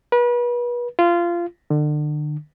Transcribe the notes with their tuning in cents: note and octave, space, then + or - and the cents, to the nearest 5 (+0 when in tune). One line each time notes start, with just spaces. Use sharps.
B4 -35
F4 -20
D3 +35